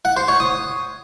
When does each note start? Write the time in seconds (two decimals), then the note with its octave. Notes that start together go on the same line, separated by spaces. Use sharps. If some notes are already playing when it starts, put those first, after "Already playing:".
0.05 F#5
0.17 C5
0.28 C#5
0.40 D#6